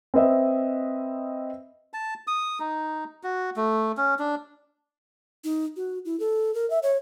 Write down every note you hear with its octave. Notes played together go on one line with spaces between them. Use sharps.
C4 B4 D#5 E5
A5
D#6
D#4
F#4
A3
C#4
D4
D#4
F#4
E4
A4
A#4
E5
C#5